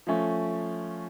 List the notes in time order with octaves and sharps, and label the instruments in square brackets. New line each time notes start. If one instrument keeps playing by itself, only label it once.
[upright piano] F3 A3 C#4